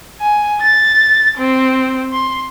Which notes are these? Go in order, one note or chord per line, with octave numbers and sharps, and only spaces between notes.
G#5
A6
C4
C6